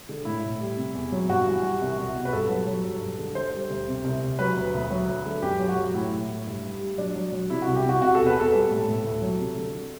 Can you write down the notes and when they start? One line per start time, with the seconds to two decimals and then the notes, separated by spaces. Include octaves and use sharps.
0.09 D3
0.25 A2 E4
0.44 A2
0.60 G3
0.77 C3
0.95 E2
1.12 F#3
1.29 G2 F#4
1.47 E3
1.64 G3
1.81 C2
1.98 C2
2.15 B2
2.25 B4
2.33 G2 A4
2.50 F#3
2.67 F#3
2.85 G2
3.01 G2
3.19 D3
3.35 D3 C5
3.53 G3
3.70 D2
3.88 C3
4.04 C2
4.22 C2
4.39 F#3 B4
4.57 D2
4.74 D2
4.91 F#3
5.08 D2
5.26 D3
5.42 F#2 G4
5.59 F#3
5.69 F#4
5.77 F#3
5.94 A2 E4
6.12 A2
6.28 A2
6.47 G2
6.64 G3
6.80 G3
6.98 F#3 D4
7.16 F#3
7.32 F#3
7.50 C3 E4
7.62 C2 F#4
7.75 G4
7.84 C3 F#4
8.01 C3 F#4
8.15 E2 A4
8.27 B4
8.36 E2 A4
8.52 G3 A4
8.70 A2
8.88 A2
9.04 D2
9.22 F#3
9.39 C3
9.56 D3